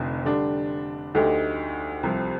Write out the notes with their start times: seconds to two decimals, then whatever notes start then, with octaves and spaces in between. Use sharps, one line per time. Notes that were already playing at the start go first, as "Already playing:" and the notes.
Already playing: F1 F2 D3 D#4
0.25 D3 G3 D4
1.15 D2 D3 A3 D#4 G4
2.03 C2 C3 F3